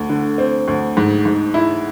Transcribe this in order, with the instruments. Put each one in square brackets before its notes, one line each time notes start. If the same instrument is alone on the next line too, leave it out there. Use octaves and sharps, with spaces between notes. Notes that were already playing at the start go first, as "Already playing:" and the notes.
Already playing: [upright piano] D2
D3
C4
D2
G#2
G#2
E4